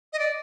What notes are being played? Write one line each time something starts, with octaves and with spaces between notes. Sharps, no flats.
D#5
D5